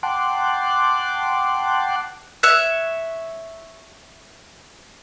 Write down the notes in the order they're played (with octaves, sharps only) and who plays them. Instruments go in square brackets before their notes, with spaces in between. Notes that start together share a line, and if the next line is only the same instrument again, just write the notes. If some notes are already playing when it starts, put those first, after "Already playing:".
[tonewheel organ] F#5 G5 A5 C6 D6 F#6
[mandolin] C#5 E5 F#6